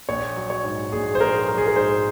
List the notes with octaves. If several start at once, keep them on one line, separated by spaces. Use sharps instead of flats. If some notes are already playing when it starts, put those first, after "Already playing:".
A#1 C#5
F#3
C#5
G#2
A#1 G#4
C5
A#1 A#4
F#3 A#4
G#4
A#4
G#2 C5